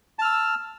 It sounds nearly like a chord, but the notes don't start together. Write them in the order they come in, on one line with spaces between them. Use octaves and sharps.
A5 F6 E6